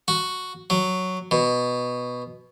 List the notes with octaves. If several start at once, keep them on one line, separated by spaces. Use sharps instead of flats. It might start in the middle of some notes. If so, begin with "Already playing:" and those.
F#4
F#3
B2